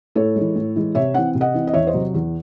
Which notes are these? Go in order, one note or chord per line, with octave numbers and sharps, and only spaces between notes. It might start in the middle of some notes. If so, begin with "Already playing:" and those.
A2 A4 C#5
E3 G#3
A2
E3 G#3
C3 C#5 E5
E3 C4 F#5
C3
D#5 F#5
E3 C4
D#5
E2 C#5 E5
C5 D#5
C3 F#3
E2